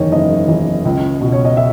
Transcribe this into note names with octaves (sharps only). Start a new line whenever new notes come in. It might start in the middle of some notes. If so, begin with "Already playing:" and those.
Already playing: F#1 E2 D#3 C#5 D#5
F#1 D#5
E2 D#3
C#2
B2
C#5
D#5
E5